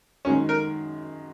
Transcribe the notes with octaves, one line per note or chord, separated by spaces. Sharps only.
F#2 D#3 G#3 C#4
A#4